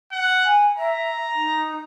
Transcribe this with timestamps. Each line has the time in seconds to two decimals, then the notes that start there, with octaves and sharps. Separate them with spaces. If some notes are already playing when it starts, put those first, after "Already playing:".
0.12 F#5
0.44 G#5
0.77 E5 A#5
1.34 D#4